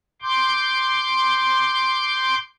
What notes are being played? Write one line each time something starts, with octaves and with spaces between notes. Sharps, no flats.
C6 D6 G6